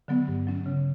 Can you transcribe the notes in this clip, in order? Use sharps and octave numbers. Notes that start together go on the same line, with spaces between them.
D3 F#3 B3
G2
F#3 C#4
C#3